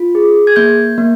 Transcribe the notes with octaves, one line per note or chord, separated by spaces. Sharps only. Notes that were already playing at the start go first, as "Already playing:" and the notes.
Already playing: F4
G#4
G#6
A#3 G6
A#3